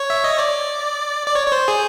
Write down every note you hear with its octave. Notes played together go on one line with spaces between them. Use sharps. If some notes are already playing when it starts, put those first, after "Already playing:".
Already playing: C#5
E5
D#5
D5
D5
C#5
C#5
C5
G#4